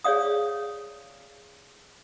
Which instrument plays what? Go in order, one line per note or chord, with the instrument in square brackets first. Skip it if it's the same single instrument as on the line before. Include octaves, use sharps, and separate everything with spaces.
[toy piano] G#4 C#5 D5 F5 D#6